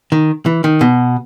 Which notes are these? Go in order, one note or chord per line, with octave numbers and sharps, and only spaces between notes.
D#3
E3
D#3
B2